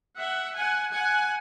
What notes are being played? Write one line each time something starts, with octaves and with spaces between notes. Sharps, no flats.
E5 F#5
F#5 G#5
F#5 G#5